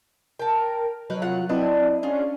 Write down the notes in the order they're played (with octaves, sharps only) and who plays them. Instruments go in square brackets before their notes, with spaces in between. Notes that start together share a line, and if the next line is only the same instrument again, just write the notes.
[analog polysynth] A#4 [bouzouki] G5 A5
[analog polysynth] F#3 [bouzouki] D#4 A#4 B4
[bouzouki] C3 F4 F#5
[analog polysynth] C4 E4 [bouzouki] D4 B4 D#5
[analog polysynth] C#4 D4 [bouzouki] F4 G#4